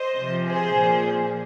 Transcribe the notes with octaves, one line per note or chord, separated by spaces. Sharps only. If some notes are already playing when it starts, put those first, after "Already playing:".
Already playing: C5 D#5
C3 F3
G#4 C5
A#2 F3